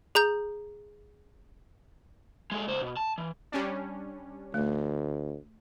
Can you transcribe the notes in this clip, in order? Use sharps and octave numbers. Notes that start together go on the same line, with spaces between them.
G#4 A#5 G6
G#3 A4
C#2 C5
B2
A5
E3
G3 C#4 D4
D2 A3